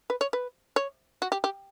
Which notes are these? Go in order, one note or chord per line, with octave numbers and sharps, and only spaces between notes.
B4
C#5
B4
C#5
F#4
G4
G4